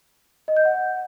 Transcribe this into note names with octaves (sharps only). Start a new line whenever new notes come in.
D#5
G6
F#5